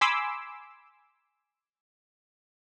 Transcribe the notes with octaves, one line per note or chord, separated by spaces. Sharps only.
G#5 B5 C6 D6 E6